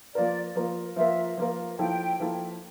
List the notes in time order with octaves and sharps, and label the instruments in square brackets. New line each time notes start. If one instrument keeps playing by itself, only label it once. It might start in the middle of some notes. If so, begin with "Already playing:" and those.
[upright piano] F3 A#3 F4 A#4 [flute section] D5
[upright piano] F3 A#3 F4 A#4
[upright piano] F3 A#3 F4 A#4 [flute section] E5
[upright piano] F3 A#3 F4 A#4
[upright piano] F3 A#3 E4 A4 [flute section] G5
[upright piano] F3 A#3 E4 A4